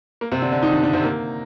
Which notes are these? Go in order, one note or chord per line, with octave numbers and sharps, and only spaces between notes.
A#3
C3 C4
D3 D4
D3 D4
D#3 D#4
D3 D4
D3 D4
C3 C4
A#3